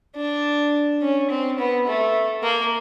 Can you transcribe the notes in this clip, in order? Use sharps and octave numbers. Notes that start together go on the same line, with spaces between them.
D4
C#4
C4
B3
A3
A#3